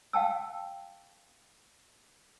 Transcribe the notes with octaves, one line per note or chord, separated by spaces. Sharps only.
F5 G5 A5 E6